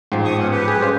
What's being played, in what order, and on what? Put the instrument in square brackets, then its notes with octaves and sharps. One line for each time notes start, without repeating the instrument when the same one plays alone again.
[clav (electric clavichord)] A1 F3 [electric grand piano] G#2 G5 C7
[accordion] F2 C#6 D#6
B3 C#4 F#5
G4 B4
[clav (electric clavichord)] G#4
[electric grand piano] G3 C#4 [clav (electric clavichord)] G#4 C5 F5